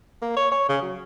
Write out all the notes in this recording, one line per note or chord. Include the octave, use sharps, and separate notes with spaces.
A#3
C#5
C#5
C#3
F#3